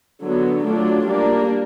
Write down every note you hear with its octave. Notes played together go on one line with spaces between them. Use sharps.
D3 F#3 B3
F#3 A3 D4 F4
G3 A#3 D4